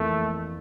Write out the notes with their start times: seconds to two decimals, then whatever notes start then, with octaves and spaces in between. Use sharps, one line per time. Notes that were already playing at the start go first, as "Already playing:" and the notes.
Already playing: F2 E3 A3 A#3